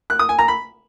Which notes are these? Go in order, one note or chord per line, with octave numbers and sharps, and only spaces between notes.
F#6
D#6
G#5
A#5
B5